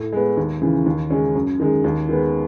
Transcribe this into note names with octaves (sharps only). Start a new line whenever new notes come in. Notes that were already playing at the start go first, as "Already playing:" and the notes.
Already playing: A2
G#3 B3
D#2
C#3 E3
D#2
C#3 G#3 C#4
F#2
D#3 G#3
D#2
D#3 G#3 B3